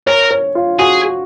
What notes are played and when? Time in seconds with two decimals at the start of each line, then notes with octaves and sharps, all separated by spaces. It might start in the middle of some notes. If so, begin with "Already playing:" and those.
0.07 A#4 C#5
0.31 C#5
0.55 F4
0.79 F#4 G#4